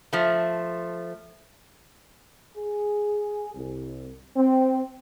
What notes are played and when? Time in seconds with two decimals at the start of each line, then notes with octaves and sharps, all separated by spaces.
0.13 F3 A3
2.56 G#4
3.55 C2
4.36 C4